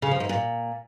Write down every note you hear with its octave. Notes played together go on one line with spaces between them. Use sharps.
C#3
F3
G#2
A#2